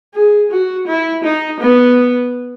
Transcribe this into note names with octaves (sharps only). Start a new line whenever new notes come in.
G#4
F#4
E4
D#4
B3